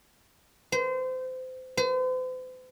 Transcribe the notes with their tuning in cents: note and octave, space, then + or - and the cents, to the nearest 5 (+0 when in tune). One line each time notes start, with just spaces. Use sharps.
C5 -30
C5 -45